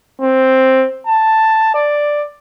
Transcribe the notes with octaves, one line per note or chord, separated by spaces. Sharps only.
C4
A5
D5